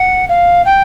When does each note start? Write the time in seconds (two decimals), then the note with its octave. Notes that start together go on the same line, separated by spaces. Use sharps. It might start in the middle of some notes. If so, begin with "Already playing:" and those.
Already playing: F#5
0.29 F5
0.66 G5